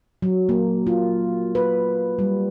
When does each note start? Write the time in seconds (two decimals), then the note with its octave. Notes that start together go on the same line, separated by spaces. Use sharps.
0.22 F#3
0.49 A#3
0.87 F4
1.55 B4
2.19 G3